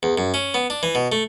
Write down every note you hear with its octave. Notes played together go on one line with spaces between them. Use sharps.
E2
F#2
C#4
B3
D4
E3
B2
A3